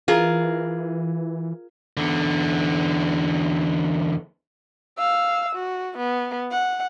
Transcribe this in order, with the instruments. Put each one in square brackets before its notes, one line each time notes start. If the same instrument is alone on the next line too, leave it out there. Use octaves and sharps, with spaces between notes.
[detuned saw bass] E3 [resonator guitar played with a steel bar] F4 G#4 A#4
[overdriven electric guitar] E2 D3
[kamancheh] F5 E6
F#4
B3
F#5